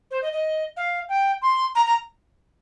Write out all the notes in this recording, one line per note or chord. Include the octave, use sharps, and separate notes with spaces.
C5
D#5
D#5
F5
G5
C6
A#5
A#5